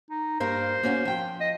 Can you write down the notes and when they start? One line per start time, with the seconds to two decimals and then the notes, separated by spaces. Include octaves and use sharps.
0.10 D#4
0.40 G2 A#3 A#4 C5
0.83 A#3 C#4 F#4
1.05 F3 G5
1.40 D#5